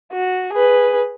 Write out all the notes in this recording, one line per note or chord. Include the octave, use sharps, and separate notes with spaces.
F#4
G#4 B4